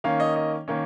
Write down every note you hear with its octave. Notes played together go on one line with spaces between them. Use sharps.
D#3 A#3 C#4 F5
D#5
D#5
D#3 A#3 C#4